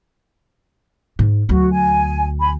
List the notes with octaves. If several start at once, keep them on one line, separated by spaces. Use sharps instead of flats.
G#2
D2 F#3 F#4
G#5
G#5 B5